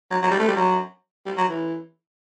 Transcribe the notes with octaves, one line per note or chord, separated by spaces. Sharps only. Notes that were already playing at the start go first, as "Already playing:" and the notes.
F#3
F#3
G3
A3
G3
F#3
G3
F#3
E3